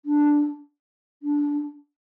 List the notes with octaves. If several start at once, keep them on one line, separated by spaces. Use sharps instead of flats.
D4
D4